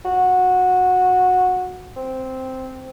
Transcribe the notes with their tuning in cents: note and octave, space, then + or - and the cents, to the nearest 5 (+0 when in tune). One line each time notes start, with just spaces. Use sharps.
F#4 -15
C4 -5